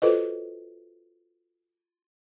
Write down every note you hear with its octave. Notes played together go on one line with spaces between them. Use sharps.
F4 F#4 A4 B4 C5 D#5